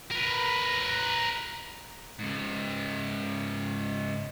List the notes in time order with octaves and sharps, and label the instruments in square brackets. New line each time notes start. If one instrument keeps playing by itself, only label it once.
[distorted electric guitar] A#4 B4
G#2 C#3